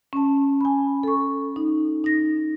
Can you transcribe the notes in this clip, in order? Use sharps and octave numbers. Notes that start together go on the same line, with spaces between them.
C#4 A5
G#5 B5
A4 C#6
D#4
D#4 A#6